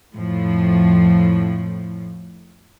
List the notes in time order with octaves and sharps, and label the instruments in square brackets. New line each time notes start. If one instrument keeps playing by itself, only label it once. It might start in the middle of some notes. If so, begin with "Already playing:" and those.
[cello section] F2 A2 F3